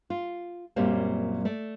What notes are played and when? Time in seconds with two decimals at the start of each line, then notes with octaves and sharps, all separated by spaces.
0.10 F4
0.76 F#2 A#2 F#3 G3 A#3 C4
1.45 A3 D5